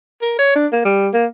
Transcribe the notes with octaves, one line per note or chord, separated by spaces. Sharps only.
A#4
C#5
D4
A#3
G3
A#3